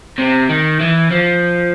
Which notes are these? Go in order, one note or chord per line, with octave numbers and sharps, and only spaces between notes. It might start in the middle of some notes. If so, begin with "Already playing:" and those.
C3
D#3
E3
F3